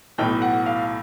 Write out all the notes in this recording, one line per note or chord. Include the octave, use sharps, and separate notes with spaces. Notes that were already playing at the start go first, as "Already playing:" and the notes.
B1 A2 E3 G5
F#5
F5